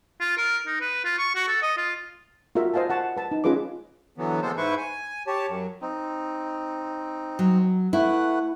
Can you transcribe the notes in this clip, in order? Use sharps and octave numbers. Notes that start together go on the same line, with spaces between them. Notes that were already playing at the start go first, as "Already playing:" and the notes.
F4
A#4
D#4
B4
F4
C#6
F#4
A4
D#5
F4
F4 F#4 A#4 E5
C5 D#5 F5 G#5 A5
F#5 A5 C#6
B4 A5
D#4
C#4 F4 G#4 B4 D#5 D6
D3 E3 F#3 B3
E3 G#3 A#3 B3 A4 C5
G#2 E4 B4 C5 C#6
G#5
G4 C#5 A5
F#2
C4 D#4
F#3
A3 E4 B4 F#5